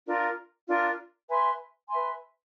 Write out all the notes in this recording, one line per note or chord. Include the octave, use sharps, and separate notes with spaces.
D4 F4 A#4
D4 F4 A#4
B4 E5 G#5 C6
B4 E5 G#5 C6